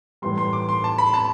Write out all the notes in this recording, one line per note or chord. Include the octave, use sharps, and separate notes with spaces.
A2 E3 G3 C6
C6
D6
C6
A5
B5
A5